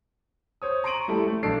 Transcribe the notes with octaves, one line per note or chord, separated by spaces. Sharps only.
C5 C#5 D#6
A#5 C6 C#6 D7 D#7 F#7
G3 A3 E4 A4
A3
B1 D4 A4 C7 D7